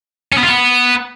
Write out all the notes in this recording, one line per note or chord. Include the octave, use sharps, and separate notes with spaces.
C#4
B3
F4
B3